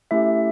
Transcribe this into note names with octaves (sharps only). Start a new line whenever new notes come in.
A3 C#4 E4 G4 E5